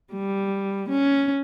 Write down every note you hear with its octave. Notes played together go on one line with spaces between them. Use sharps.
G3
C#4